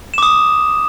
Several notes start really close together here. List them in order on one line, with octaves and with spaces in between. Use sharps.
E7 D6 D#6